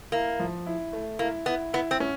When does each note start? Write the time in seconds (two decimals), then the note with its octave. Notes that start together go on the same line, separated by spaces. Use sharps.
0.12 A#3 E4
0.39 F3
0.66 E4
0.93 A3
1.19 A#3 E4
1.46 B3 E4
1.73 B3 E4
1.91 C4
2.00 C#4